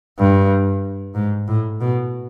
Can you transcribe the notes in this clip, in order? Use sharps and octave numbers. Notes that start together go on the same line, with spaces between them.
G2
G#2
A2
B2